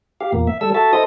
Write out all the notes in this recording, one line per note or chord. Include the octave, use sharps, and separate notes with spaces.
G4 F5
E2 A#2 A#3
E5
G3 A4 E6
F#4 A4 E5 A5
E4 A4 C5 D#5 D#6